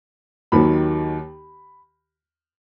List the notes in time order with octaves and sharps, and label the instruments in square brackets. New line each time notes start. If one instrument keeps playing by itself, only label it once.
[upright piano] D#2 D#3 F#3 B5